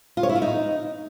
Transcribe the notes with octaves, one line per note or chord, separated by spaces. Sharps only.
F4
C#5
E4
F4
D#4